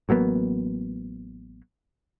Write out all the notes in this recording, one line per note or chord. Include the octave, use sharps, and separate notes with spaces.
A1 F#3 A#3 B3